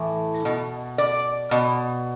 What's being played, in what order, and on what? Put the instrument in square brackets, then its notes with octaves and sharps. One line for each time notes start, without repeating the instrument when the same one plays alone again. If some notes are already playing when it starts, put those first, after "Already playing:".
Already playing: [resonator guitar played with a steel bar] A2 E3
B2
D5
B2